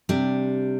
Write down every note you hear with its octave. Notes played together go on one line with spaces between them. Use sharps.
C3 G3 D4